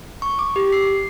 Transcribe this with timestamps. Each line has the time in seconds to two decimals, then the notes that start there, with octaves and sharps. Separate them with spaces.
0.22 C#6
0.39 D6
0.56 G4
0.73 C7